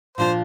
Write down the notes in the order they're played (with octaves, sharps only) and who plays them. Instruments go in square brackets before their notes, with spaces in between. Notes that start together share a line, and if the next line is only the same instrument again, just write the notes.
[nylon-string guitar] A#2 F3 D4 F4 [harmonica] C5